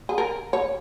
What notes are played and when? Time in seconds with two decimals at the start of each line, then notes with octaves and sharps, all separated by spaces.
0.09 G#4
0.18 A#4
0.53 C#5